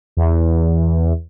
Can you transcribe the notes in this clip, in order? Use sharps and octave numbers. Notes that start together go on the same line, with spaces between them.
E2